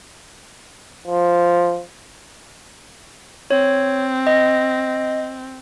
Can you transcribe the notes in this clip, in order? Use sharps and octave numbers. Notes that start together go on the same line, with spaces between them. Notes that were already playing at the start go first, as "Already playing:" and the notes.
F3
C4 C#5
D#5